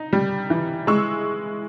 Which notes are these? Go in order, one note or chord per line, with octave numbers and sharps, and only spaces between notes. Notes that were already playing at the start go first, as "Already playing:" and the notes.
Already playing: D#4
G3
E3
G#3 C#6 E6